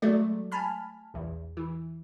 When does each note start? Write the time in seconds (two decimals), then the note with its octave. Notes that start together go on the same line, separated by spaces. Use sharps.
0.02 F#3 G#3 A3 D5
0.52 G#5 A5 B5 F6
1.14 A#1 E2
1.57 E3